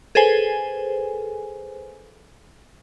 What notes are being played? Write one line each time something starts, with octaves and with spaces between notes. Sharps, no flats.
G#4 A4 B4 C5 G#5